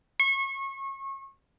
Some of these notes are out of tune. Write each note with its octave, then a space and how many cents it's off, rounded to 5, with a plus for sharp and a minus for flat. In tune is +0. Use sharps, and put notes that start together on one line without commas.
C#6 -30